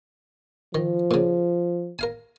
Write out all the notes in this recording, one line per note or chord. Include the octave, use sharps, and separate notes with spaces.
D#3 F3
A#2 C#3
A#4 F5 G#5